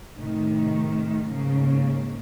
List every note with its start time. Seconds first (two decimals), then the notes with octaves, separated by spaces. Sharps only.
0.15 A2 C3 D#3
1.27 G#2 C#3 A#3